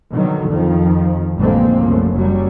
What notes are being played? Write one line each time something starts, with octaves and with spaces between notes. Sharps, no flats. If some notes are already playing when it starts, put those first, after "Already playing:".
B2 D3 D#3 F#3
F2 D#3 F3
A1 F2 D3 G#3 A#3 C4
C2 F#2 F3 A3
F#1 F#3 G3